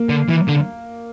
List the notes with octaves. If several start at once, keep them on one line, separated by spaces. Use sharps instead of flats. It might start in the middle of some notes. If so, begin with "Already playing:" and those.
Already playing: A#3
D3
E3
D3